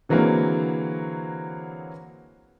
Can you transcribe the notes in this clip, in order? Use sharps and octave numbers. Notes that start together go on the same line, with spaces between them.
D3 E3 F#3 G#3 A#3 C4